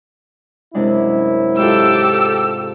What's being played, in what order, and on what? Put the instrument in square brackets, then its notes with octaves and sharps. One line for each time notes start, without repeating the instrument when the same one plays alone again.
[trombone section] F#2 E4 [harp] C3 G#3 D4
[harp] G#2 F4 [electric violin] G4 A4 [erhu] E6